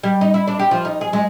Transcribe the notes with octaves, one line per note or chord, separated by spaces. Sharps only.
G3
D#4
E4
D4
G4
F3
D#4
G#4
G#3